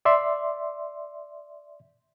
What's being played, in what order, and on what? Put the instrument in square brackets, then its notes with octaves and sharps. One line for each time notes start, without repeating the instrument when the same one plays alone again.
[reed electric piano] D5 E5 C6